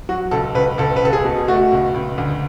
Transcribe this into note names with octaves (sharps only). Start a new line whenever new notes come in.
F#3 F#4
C#2 A4
C#2 B4
C#2 A4
B4
C#2 A4
G#4
B2
A3 F#4
C#2
C#2
D2